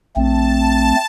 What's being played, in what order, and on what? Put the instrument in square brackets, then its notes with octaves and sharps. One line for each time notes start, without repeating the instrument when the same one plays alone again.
[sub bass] A#1 [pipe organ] A3 C4 [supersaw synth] A5